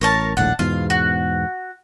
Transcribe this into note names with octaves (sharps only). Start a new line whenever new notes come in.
A1 A#4 C#5 A5
D#1 A#1 A2 D4 F#5
E2 G#2 B2 F4 F5
F#4